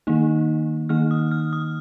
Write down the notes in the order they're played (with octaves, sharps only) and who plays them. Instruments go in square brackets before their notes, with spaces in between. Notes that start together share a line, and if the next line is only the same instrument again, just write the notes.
[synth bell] D#3 A#3 D#4
D#3 A#3 D#4 F6
D#6
F6
D#6